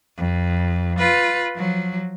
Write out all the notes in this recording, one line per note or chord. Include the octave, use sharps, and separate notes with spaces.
F2
F4 B4
F3 F#3